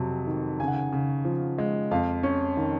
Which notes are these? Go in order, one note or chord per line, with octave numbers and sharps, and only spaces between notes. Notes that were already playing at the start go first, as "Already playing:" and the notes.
Already playing: F2 C3 F#3
D#3
C#3 G#5
F#5
G#5
C#3
F3
G#3
F2 F5
C#4
D#3